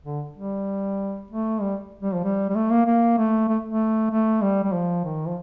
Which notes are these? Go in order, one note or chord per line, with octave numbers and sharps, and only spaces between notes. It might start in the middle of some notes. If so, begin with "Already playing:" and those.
D3
G3
A3
G3
G3
F3
G3
G3
A3
A#3
A#3
A3
A3
A3
A3
G3
G3
F3
D#3
F3